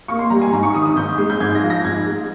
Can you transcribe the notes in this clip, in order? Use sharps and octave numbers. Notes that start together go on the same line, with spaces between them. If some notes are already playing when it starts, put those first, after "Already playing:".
A#3 C#6
C6
G3 A#5
G#5
G#2 A#5
C#6
D#3 D#6
D#6
G#2 G6
G#3
G6
G#2 G#6
A#6
F3
A#6
G#2 G#6
G#3